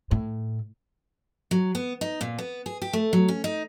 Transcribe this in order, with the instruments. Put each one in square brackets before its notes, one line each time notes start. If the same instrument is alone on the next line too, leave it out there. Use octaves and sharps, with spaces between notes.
[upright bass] A2
[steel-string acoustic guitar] F#3
B3
D#4
A#2
B3
G#4
G4
A3
F#3
C#4
D#4